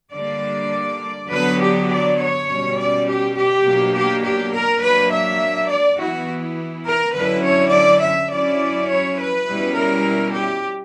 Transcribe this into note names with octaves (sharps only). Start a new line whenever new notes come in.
D3 G3 A#3 D4 D5
D3 F#3 B3 D4 B4
G4
D5
C#5
B2 G3 C#4
D5
G4
G4
B2 F#3 A#3 D4
G4
G4
A#4
F#3 A#3 D4 B4
E5
D5
E3 B3 E4 F#4
A#4
D3 F#3 C#4 E4 B4
C#5
D5
E5
F#3 C#4 E4 D5
C#5
B4
B2 G3 C#4 E4
A#4
G4